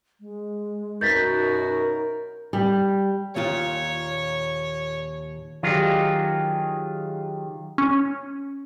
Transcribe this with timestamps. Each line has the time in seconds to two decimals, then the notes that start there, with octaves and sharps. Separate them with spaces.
0.21 G#3
1.01 F#2 B2 D#4 F#4 A#4 G6 A6 B6
2.53 G3
3.36 D#2 A#2 F4 C#5
5.63 D#3 F#3 F4 G4 G#4 D#5
7.78 C#4